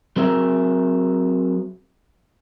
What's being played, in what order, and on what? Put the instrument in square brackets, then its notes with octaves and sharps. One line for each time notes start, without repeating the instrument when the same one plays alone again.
[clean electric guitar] F#3 C4 G#4 A#4 E5